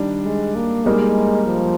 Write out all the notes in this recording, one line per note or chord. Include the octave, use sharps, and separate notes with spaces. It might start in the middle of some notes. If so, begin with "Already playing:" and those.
Already playing: D#3 G3 D4
G#3
A#3
G3 G#3 A#3 D#4 A#4
F3